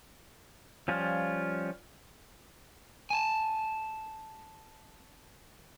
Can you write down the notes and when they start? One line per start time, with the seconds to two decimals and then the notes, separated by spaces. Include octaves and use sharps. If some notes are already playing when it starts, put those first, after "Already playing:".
0.88 F3 G3 C#4 F4
3.10 G#5 A5